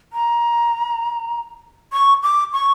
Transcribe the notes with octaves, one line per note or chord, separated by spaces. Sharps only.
A#5
C#6
D6
C#6